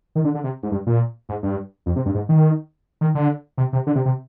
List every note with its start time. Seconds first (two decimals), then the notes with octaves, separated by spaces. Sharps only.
0.15 D#3
0.24 D3
0.34 D3
0.44 C3
0.63 G#2
0.71 G2
0.87 A#2
1.29 G#2
1.43 G2
1.86 F2
1.96 C3
2.06 G2
2.15 G#2
2.29 D#3
3.01 D#3
3.15 D3
3.58 C3
3.73 C3
3.87 D3
3.95 C3
4.06 C3